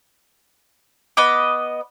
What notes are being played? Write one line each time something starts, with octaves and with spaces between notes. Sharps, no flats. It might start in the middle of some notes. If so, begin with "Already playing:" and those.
B3 D#5 B5 D6